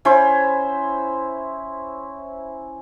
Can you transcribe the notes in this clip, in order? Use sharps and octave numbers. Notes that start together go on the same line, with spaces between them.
C#4 E4 C5